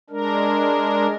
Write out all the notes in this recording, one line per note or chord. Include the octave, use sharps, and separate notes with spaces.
G#3 D4 A#4